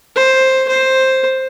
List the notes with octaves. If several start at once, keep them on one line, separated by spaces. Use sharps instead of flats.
C5
C5